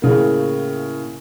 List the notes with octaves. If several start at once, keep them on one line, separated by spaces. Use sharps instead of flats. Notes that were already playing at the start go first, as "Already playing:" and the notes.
A2 C#3 A#3